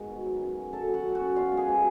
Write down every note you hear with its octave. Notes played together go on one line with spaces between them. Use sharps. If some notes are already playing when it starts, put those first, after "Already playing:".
Already playing: D#3 G#3 B3 F#4 F#5
B2
F#3
C#4
A#3
B2 A4 A5
F#3
F#4 F#5
C#4
F#4 F#5
A#3
B2 F4 F5
G#3
G#4 G#5
B2